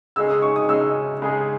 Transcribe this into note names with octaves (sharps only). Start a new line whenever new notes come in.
C#3 G#3 D#4 G#4 E6
D#6
C#6
D#6
C#3 G#3 D#4 G#4 E6
C#3 G#3 D#4 G#4